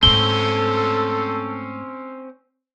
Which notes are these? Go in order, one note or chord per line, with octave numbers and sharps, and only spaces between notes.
G#2 A3 C4 C#4 A4 G7